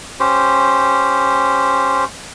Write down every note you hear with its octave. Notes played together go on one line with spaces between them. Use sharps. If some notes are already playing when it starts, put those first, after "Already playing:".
C#4 G4 C5